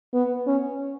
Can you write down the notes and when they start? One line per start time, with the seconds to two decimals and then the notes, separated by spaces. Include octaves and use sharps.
0.14 B3
0.47 C#4